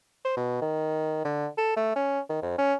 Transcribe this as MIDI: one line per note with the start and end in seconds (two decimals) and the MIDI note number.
0.25 0.35 72
0.37 0.57 47
0.62 1.20 51
1.25 1.48 50
1.58 1.73 69
1.77 1.91 57
1.96 2.20 61
2.30 2.42 51
2.42 2.53 41
2.58 2.74 61